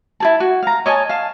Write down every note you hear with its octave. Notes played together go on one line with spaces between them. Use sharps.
E4 G#4 A5
F#4
F5 A#5
C#5 D#5 G#5 A5
F5 A5